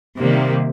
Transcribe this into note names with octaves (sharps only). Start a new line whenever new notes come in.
C3 D#3 G3 A#3